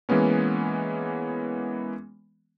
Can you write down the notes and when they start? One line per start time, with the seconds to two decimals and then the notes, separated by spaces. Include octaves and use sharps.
0.09 E3 G#3 A#3 B3 C#4